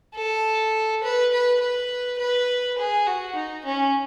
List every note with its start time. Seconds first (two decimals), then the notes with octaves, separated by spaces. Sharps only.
0.15 A4
1.03 B4
1.32 B4
1.61 B4
2.19 B4
2.78 G#4
3.06 F#4
3.35 D#4
3.65 C#4